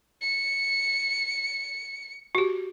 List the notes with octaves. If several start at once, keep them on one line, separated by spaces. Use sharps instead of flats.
C#7
F#4 G4